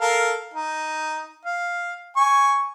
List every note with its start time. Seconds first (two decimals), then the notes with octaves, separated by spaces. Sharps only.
0.01 A4 A#4 F5
0.54 D#4
1.45 F5
2.17 G#5 C#6